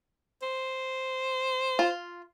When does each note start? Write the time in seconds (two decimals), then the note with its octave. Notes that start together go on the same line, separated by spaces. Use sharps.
0.42 C5
1.79 F4